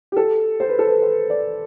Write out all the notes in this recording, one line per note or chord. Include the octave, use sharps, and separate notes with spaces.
G4
A4
C5
B4
A4
B4
C5
D5